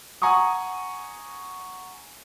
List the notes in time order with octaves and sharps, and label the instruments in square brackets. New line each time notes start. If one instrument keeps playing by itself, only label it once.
[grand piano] F#5 G#5 A#5 C#6 D#6